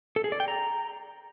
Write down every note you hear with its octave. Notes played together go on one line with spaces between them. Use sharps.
A4
G#4
D5
G5
A#5